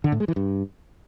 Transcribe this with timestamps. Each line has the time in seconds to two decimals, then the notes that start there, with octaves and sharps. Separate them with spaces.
0.04 D3
0.12 A2
0.20 G#3
0.28 E3
0.36 G2